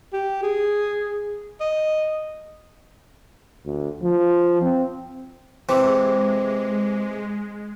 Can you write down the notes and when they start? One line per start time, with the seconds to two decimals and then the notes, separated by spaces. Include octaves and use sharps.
0.13 G4
0.43 G#4
1.60 D#5
3.65 D2
4.03 F3
4.62 C4
5.69 C3 E3 G#3